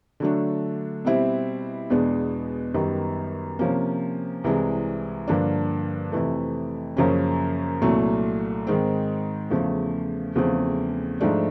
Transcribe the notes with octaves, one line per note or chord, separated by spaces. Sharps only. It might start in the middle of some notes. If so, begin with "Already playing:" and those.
D3 F#3 A3 D4
B2 G3 C4 E4
E2 B2 G#3 B3 D4
F#2 D#3 G3 B3
C3 F3 A#3 C#4
C2 C3 E3 G#3
G2 D3 F3 A#3 D4
F2 C3 E3 A3
F#2 C#3 F3 A#3 C#4
C2 A#2 F#3 A3
G#2 D#3 G#3 C4
E2 C#3 F3 A3
E2 C#3 F3 A3 C4
G#2 F3 A3 D4